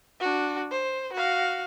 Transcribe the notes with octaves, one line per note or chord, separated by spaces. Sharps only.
D4 F#4
C5
F#4 F5